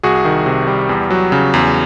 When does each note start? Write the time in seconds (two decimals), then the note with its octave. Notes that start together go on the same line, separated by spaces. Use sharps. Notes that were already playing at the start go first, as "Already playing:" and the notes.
0.03 C2 F#4 G#4
0.25 D#3
0.46 C3
0.67 G3
0.89 E2
1.10 F#3
1.32 C#3
1.54 E2